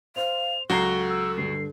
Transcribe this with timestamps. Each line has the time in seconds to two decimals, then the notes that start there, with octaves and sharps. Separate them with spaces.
0.16 C5 F5 F7
0.70 C#2 F#3 F#4 A4 A#5 C7 G7
1.10 E6
1.38 G2 D3 C7